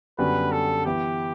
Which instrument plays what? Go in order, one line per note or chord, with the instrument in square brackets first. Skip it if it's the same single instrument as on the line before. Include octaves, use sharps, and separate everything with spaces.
[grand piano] F#2 D3 G3 B3 F#4 [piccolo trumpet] B4
[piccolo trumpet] A4
[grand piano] E3 B3 E4 [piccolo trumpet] G4